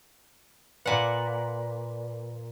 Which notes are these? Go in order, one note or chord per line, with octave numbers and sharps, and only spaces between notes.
A#2 B4 D5 F#5